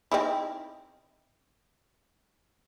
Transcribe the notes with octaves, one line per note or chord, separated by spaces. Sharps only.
C4 D#4 E4